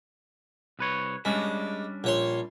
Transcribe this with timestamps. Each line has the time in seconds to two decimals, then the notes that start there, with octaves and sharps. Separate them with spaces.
0.79 C2 B4 C#5
1.25 G3 G#3 C#4 D4
2.04 A#1 C#5 C6